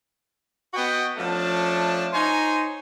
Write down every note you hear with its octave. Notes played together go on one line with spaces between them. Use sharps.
B3 F#4 B4 D#5 G5
F3 A3 C#4 D4 A5
D#4 C5 C#5 G#5 A#5